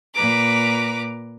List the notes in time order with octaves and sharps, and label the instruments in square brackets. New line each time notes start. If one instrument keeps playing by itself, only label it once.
[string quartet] A#2 B4 A#5 D6